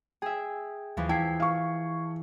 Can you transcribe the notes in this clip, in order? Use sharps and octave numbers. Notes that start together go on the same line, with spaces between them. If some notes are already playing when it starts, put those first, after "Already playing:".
G#4 E5 G5
D#2 E3 F3
E4 G5 A5 G#6 C7
F5 C#6